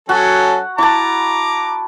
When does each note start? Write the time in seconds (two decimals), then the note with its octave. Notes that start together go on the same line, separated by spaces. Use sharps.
0.09 F#3 C#4 F#4 A4 F#5
0.78 E4 A5 A#5 D6